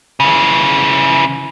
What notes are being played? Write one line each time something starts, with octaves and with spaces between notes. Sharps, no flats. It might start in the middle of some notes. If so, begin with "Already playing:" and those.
C#3 E3